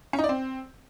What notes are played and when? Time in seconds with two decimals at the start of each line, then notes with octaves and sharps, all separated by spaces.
0.13 C#4
0.19 D#4
0.24 D5
0.29 C4